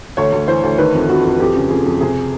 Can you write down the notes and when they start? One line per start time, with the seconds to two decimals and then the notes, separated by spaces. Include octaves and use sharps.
0.17 D2 C#5
0.32 D2
0.48 E3 C5
0.63 D2
0.78 D#3 B4
0.94 F2
1.09 F2 F#4
1.24 F2
1.40 F2 G4
1.55 C#3
1.70 F2 G#4
1.86 F2
2.01 C3 G#4